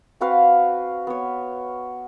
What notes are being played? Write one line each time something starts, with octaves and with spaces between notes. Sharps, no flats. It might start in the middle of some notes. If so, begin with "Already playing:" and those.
C4 F#4 B4 F5
B3 C#5